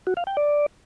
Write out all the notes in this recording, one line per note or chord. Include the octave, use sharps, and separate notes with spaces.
F#4
F5
G5
D5